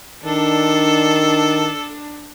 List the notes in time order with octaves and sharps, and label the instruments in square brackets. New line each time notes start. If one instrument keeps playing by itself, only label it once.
[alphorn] D#3 [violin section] D4 [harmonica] A4